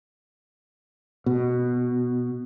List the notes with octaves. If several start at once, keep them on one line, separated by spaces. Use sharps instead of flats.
B2